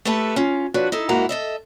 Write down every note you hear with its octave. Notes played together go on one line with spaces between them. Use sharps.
A3 G4 A4 B4 E5 A5
C#4 F4
F3 D4 F#4 B4 C#5
D#4 E4 A4
G#2 A#3 E4 F#4 A#5
A4 D#5 E5